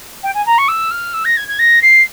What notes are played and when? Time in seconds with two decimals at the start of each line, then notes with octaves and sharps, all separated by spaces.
0.23 G5
0.34 G#5
0.46 A#5
0.58 C#6
0.68 E6
0.91 F6
1.14 E6
1.25 A#6
1.37 G#6
1.48 G#6
1.59 A#6
1.82 C7